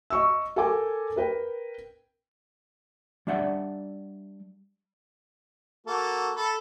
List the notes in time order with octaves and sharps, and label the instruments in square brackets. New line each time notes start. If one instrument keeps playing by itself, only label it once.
[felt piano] D#5 C#6 E6
A4 A#4 G5 G#5 D6
A#4 B4 G5
[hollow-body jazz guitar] G3 D4 D5 E5 F#5
[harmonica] A#3 F#4 A4
A4 B5